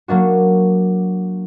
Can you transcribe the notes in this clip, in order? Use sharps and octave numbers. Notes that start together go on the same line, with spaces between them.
F#3 A#3 D4 F#4